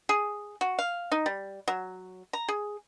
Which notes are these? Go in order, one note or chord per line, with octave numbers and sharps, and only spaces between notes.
G#4
F#4
F5
D#4
G3
F#3
A#5
G#4